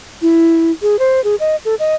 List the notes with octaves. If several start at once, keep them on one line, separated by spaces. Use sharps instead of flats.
E4
G#4
C5
G#4
D#5
A4
D#5